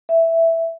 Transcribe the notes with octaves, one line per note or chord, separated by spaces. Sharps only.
E5